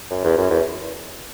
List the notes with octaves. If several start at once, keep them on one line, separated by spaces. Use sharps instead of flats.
F#2
E2
F#2
E2